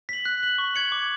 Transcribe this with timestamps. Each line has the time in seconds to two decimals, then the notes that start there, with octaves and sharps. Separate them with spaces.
0.09 B6 F#7
0.25 F#6
0.42 B6 F#7
0.58 C#6
0.75 G#6 C#7 F#7
0.92 D6